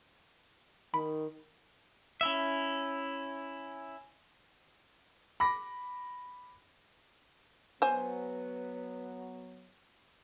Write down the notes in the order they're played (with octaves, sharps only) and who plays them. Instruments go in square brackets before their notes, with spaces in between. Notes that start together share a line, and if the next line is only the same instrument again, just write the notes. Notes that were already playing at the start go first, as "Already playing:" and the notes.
[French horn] D#3 [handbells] B5
[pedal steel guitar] C#4 E4 E5
[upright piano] B5 D6 A#6
[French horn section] F#3 B3 [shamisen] C5 G#5